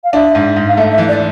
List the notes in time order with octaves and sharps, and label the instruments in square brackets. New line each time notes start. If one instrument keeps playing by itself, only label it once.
[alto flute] F5
[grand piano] D4 [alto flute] E5
[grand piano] G#2
G#2
[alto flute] F5
[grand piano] A3 [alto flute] E5
[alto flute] E5
[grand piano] E3
[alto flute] D5